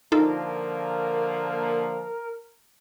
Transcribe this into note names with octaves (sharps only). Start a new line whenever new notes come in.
D3 F3 A#3 D#4 F4 A4 A#4